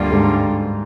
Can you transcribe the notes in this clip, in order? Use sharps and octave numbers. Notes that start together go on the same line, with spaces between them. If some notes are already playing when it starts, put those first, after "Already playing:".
Already playing: D2 G2 D3 G3 A#3 F4
G#2